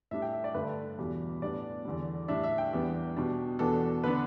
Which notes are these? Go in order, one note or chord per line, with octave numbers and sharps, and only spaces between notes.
A2 G3 D4 E5
G5
E5
D5
G2 D3 A3 D4 B4
E2 B2 G3
A2 G3 B3 D4 D5
E2 D3 G3
A2 G3 D4 E5
E5
G5
E2 E3 G3 B3 D4
B2 G3 D4
E2 B2 B3 D4 A4
D3 B3 D4 B4